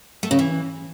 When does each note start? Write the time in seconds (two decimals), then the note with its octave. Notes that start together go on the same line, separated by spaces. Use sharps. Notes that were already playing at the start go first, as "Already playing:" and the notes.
0.23 A3
0.31 C#3
0.39 E3